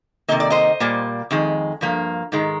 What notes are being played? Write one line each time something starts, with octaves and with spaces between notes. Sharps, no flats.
C3 D#3 A#3 D#5
D5
C5 D#5
A#2 G3 A#3
F2 D#3 G#3
G2 F3 A#3
G#2 D#3 G#3